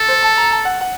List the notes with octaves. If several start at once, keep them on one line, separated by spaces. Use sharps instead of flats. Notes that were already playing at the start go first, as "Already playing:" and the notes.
Already playing: A4
C5
A5
A#5
A5
F#5
F#5